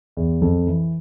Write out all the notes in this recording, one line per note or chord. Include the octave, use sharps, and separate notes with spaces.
E2
F2
E3